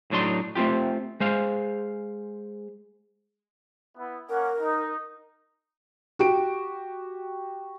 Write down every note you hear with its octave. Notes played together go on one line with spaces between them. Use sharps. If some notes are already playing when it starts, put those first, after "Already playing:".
A2 F#3 D4 D#4 C6
A3 C4 D#4 F4 G4
G#3 C5 F5
B3 E4
A#3 C#4 A#4 F#5
D#4
F#4 G4 D7